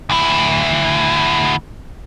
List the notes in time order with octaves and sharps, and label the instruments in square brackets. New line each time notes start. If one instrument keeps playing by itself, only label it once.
[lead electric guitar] D2 E4